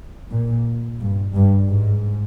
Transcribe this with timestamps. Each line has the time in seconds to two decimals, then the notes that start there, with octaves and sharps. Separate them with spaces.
0.31 A#2
1.00 G2
1.35 G2
1.69 G#2